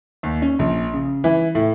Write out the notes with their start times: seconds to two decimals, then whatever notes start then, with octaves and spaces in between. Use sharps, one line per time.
0.23 D#2
0.42 C#4
0.59 A#1
0.93 C#3
1.24 E3
1.55 A2